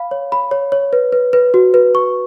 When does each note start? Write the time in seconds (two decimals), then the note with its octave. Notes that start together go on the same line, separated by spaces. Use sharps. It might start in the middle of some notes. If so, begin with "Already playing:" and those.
Already playing: F5 B5
0.11 C#5
0.32 B5
0.51 C#5
0.72 C#5
0.93 B4
1.12 B4
1.33 B4
1.54 F#4
1.74 B4
1.95 C#6